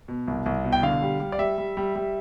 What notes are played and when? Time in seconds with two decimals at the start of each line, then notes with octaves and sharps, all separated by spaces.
0.08 B2
0.28 C2
0.46 C2
0.64 B2
0.72 G5
0.83 D3 F5
1.02 G3
1.20 G3
1.32 D5
1.39 G3 E5
1.58 G3
1.77 G3
1.96 G3